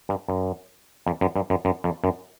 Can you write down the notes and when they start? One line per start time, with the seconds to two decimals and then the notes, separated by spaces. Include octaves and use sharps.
0.09 G2
0.28 F#2
1.06 F2
1.21 F#2
1.36 G2
1.50 F#2
1.65 F#2
1.84 F2
2.04 F#2